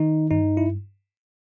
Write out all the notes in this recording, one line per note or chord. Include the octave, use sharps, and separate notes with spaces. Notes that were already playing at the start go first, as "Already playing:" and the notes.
Already playing: D#3 D#4
G2 D#4
E4